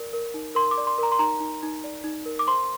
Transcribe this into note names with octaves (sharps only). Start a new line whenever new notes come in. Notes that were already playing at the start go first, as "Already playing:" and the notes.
Already playing: A#4 D5
A#4
D#4
A#4 C6
D6
D5
C6
A#4 A#5
C6
D#4 A#5
D#4
D#4
D5
D#4
A#4
D6
C5 C6